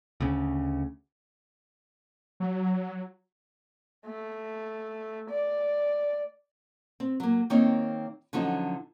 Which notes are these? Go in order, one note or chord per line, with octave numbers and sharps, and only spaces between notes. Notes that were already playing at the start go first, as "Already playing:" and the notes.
D2 C#3
F#3
A3
D5
C4
F#3 A#3
D#3 A#3 C4 D#4 C#5
D3 F3 F#3 C#4 D#4 F#4